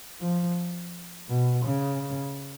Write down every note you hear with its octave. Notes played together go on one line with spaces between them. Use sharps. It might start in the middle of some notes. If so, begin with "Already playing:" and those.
F3
B2
C#3